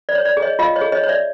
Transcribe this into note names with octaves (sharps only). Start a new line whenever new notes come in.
D5
C#5
D5
G#4
C#5 D#5
F4 D#5 F5
C#5 D#5
G#4
C#5 D#5
C#5
D5 E5